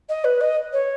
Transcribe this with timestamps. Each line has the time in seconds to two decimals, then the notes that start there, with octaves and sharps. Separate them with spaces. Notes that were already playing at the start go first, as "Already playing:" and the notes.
0.09 D#5
0.24 B4
0.40 D#5
0.73 C#5